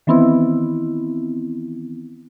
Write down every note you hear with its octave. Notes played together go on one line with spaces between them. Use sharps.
D#3 E3 B3 C4 E4